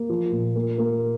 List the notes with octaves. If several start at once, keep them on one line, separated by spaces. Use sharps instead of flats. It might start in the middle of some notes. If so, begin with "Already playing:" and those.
Already playing: A#3
F3
A#2
A#3
A#3